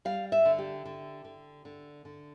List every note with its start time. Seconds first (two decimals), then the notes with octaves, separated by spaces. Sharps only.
0.05 G3 F5
0.32 E5
0.45 D3
0.59 G4
0.85 D3
1.25 D3
1.65 D3
2.05 D3